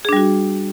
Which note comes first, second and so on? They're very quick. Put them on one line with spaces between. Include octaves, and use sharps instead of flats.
G#4 D4 G3 F#4